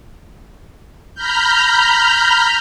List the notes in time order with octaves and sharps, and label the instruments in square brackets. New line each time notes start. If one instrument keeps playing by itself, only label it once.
[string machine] A#5 B5 F6 G6